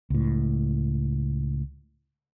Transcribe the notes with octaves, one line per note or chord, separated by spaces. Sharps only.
C#2 A2